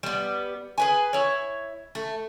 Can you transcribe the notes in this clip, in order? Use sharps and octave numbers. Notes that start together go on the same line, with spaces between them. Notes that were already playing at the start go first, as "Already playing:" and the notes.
G3 B3
G#4 B4 G#5
E4 C#5
A3